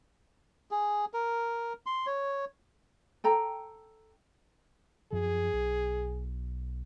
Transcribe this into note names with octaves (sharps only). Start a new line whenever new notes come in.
G#4
A#4
C6
C#5
A4 G5 A#5
F#2 F3 G#4
B1